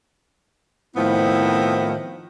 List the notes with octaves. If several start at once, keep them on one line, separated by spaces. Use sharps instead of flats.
A2 D#3 F3 B3 C4 E4